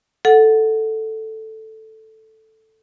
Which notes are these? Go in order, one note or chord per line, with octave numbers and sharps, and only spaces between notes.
A4 F#5